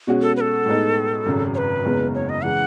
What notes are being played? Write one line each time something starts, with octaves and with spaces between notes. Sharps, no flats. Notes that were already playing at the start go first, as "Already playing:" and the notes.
B2 G#3 C#4 F#4
A4
B4
A4
A2 G#3 B3 D#4
G#1 F#2 C#3
C#5
B4
F#1 E2 C#3 G#3 B3
C#5
D#5
C#3 E3 G#3 F#5